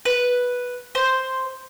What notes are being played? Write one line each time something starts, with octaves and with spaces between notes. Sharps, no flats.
B4
C5